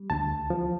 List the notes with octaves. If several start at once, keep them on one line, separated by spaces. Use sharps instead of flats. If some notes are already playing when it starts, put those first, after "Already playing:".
Already playing: G3
D2 A5
F3